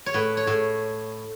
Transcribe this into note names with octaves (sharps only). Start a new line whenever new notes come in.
C#5
A2 B4
C#5
A2